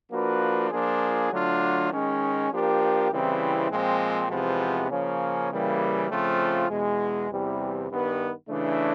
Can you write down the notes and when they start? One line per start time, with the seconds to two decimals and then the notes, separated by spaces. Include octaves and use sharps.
0.10 F3 A#3 D4 F#4 B4
0.70 F3 A#3 D4 F4 G#4
1.30 D3 F#3 A3 D4 F4
1.90 D#3 G#3 C#4
2.50 F3 A#3 D4 G4 A#4
3.09 C#3 E3 G3 C4 E4
3.70 A#2 F3 G#3 C4
4.29 E2 C3 F3 G#3 B3
4.90 C#3 F3 A#3 C#4
5.49 C#3 E3 G3 A#3
6.09 C#3 F3 A3 C4 F4
6.69 E2 B2 G#3
7.29 E2 C3 E3 G3
7.89 G2 D#3 G3 B3
8.48 C#3 E3 A3 D4